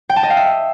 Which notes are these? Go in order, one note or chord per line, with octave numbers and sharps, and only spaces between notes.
G5
A5
D#5
F5
E5